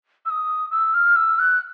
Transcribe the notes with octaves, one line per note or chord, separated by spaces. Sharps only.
E6
D#6
E6
F6
E6
F#6